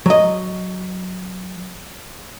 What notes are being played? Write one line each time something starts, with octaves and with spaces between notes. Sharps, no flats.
F#3 D#5